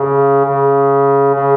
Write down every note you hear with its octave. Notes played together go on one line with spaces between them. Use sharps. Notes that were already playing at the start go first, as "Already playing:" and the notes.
Already playing: C#3
C#3
C#3